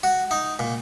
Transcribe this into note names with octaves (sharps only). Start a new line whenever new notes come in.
F#4
D#4
A#2